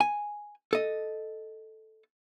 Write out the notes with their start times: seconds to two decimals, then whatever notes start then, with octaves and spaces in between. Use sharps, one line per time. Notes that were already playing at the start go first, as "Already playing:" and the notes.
0.01 G#5
0.73 A4 D#5